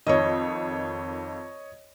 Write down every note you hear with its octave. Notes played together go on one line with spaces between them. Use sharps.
F2 D#3 C#5 D#5